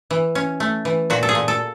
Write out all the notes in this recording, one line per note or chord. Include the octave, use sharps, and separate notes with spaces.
E3
C#4
A3
E3
A#2 F#4
A4
G#4
A#2
A4